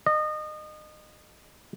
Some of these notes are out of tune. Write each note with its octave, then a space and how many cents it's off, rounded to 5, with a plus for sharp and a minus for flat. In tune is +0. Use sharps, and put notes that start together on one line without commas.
D#5 -30